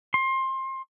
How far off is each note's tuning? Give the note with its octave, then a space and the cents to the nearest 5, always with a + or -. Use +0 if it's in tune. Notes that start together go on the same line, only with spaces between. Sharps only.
C6 +25